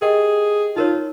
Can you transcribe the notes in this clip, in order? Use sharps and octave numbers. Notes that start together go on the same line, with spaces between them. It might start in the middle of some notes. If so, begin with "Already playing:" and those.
G4 G#4 A#4 D#5 G5
D#4 F4 A#4 C#5